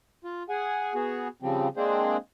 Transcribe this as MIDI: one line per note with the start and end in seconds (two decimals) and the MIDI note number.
0.24 0.43 65
0.49 0.94 68
0.49 0.94 78
0.49 0.94 80
0.95 1.28 59
0.95 1.28 66
0.95 1.28 68
1.42 1.68 49
1.42 1.68 53
1.42 1.68 55
1.42 1.68 60
1.77 2.17 56
1.77 2.17 58
1.77 2.17 60
1.77 2.17 62
1.77 2.17 68
1.77 2.17 72